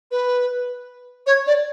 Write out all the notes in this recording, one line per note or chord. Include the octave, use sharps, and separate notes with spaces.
B4
C#5
D5